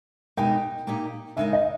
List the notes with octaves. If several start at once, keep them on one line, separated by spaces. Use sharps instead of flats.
B2 G#3 D#4 G4 A#4 G5
A#2 A#3 D#4 G4
C#3 G#3 D#4 A#4 E5
D#5